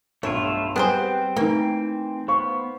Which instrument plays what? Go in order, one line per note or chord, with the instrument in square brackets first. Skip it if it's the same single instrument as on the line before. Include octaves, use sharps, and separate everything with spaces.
[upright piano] B1 G2 [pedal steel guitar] A3 E4 F4 [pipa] C#5
[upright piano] G3 [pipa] B3 G#4 C5 [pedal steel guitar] C4 G5 F#6
[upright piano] E3 [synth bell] A3 D#4 [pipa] A#3
[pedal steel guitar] B3 [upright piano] C5 F5 C#6